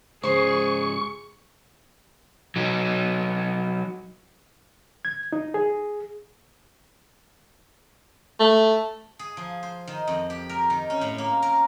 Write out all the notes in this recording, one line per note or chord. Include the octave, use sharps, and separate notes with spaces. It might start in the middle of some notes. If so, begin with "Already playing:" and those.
G#2 C#3 G#4 C5 C#6
F#3 D#4
G#6
D#4
G#4
A3
G#4
F3
C5
D#3
F2
G4
A#4
D#3
C#4
A2
A#3
A#4